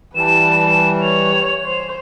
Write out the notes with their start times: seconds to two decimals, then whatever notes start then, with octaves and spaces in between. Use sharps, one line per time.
0.15 E3 G3 B4 A5 E7
1.02 C#5 F7
1.66 C5